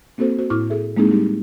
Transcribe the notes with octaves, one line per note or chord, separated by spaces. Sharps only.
A#3 C4 F#4 A4 C5
F#4 C5
A2 E4 C#6 D6 F6
G#4 A4 E5
G#3 A#3 C4 D#4 E4 G#4
G3 D#4 G4